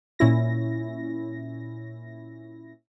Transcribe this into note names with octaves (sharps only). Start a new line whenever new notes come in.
A#2 C#4 E4 A#6